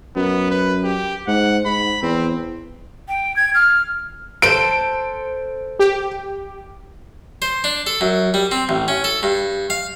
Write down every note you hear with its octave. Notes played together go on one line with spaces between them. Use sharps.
F#2 B3
B4
G4
G#2 F#5
G#2 B5
E2 C4
G5
G#6
F6
A4 C5 D7
G4
C5
D4
A4
F#2
G3
C4
A1
C#4
A4
G2
F5